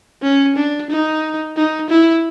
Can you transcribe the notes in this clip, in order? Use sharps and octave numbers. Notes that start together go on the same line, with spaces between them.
C#4
D4
D#4
D#4
E4